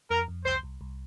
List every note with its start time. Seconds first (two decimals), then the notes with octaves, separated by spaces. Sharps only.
0.10 F2 A#4
0.28 F2
0.45 C2 C5
0.63 C2
0.81 C2